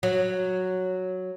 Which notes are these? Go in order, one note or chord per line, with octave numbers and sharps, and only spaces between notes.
F#3